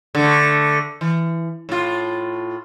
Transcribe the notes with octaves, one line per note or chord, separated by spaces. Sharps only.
D3 A3
E3
A2 F4